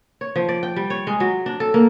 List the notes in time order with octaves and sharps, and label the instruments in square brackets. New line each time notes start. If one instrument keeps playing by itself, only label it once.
[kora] C#5
F3
D5
G5
G3
C#5
G#3
F#3
D4
A4
A#3